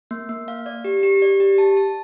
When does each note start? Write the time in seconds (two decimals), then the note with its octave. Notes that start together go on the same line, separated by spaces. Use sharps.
0.11 A#3
0.29 A#3
0.48 F5
0.66 D5
0.85 G4
1.03 G4
1.22 D5
1.40 G4
1.58 A5
1.77 A5